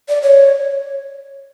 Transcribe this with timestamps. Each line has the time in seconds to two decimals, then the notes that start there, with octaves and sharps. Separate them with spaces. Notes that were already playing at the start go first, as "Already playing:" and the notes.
0.09 D5
0.22 C#5